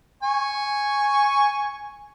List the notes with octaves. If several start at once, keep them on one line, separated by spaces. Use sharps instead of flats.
G#5 C#6